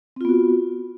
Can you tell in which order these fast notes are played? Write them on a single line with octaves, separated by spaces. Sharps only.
C4 F4 B3 F#4